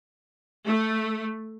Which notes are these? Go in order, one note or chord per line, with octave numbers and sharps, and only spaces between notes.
A3